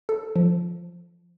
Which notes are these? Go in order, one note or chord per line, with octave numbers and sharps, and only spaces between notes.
A4
F3